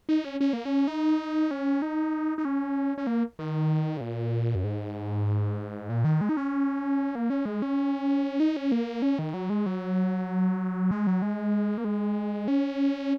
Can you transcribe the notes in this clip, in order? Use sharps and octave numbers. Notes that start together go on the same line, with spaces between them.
D#4
C#4
C#4
A#3
C#4
D#4
C#4
D#4
D#4
C#4
C#4
A#3
D#3
C#3
A#2
F#2
G#2
A#2
D#3
G#3
D#4
C#4
A#3
C#4
G#3
C#4
D#4
C#4
A#3
C#4
D#3
F#3
G#3
F#3
G#3
F#3
G#3
A#3
G#3
C#4